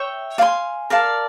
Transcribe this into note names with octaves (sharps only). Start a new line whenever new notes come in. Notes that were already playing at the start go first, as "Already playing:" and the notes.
Already playing: C#5 E5 G5
D5 F5 G#5 C6
A#4 D5 F5 A5